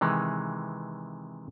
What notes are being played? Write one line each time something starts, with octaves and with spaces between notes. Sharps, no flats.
C3 D#3 E3 G#3